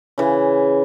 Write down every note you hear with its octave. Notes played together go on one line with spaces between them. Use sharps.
C#3 E3